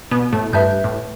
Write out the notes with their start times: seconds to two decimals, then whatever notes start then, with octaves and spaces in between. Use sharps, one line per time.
0.11 B2 B3
0.33 A2 A3
0.53 G2 G3 B4 E5 A5 G6
0.84 A2